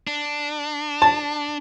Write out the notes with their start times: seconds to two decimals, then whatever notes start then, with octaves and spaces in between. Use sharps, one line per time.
0.07 D4
1.02 A5